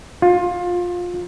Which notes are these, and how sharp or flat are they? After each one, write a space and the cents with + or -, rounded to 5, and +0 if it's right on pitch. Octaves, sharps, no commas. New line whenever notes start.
F4 +20